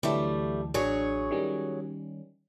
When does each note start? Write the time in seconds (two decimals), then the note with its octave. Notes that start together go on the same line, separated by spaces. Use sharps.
0.03 D2 E3 F#3 G3 A3
0.74 A1 F#3 D4 G#4 C#5 C#6
1.31 D#3 G3 C#4